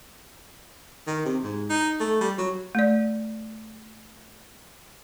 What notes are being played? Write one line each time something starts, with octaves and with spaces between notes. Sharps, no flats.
D#3
C3
G#2
D#4
A3
G3
F#3
A3 D5